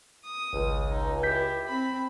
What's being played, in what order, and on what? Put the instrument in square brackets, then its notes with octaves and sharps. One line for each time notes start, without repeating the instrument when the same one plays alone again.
[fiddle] D#6
[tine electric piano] G#1 [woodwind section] C#2
[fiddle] D#4
[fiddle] E4 G4 [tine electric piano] G6 B6
[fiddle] C4 B5